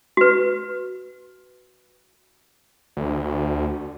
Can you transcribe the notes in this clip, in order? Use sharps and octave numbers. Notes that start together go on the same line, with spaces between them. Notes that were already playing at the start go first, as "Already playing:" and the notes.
F#4 B4
D2